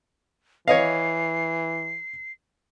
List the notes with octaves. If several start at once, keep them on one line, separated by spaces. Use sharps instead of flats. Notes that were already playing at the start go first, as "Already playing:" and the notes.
E3 C#5 D#5 F5 C7